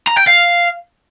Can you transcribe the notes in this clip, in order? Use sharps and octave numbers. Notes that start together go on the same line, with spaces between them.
A#5
G5
F5